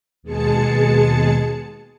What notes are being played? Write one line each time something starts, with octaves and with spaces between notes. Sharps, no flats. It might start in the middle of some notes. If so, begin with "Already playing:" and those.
D#2 B2 G#3 G#4 A5 C#7